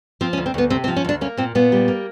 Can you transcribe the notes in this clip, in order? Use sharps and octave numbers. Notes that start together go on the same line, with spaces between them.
F3 C4
C#4
D2
C4
D2 B3
C3 C4
C4
F3
C#4
D2 D4
A#3 C#4
A#2 C4
A#2 B3
G3
A#3